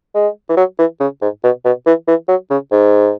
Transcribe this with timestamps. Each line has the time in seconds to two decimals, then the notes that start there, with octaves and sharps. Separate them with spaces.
0.15 G#3
0.49 E3
0.57 F#3
0.78 E3
1.00 C#3
1.21 G#2
1.44 B2
1.65 B2
1.86 E3
2.08 E3
2.28 F#3
2.50 C#3
2.72 G#2